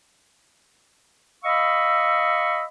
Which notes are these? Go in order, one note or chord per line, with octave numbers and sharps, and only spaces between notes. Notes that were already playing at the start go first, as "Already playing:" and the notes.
D#5 F5 B5 C#6 E6